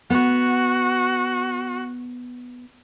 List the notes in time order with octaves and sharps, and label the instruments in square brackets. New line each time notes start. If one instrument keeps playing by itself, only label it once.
[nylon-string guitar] B3 [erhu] F#4